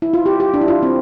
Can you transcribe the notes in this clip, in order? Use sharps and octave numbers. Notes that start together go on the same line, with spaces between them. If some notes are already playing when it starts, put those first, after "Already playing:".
E4
F4
G4
G4
D4
E4
F4
C4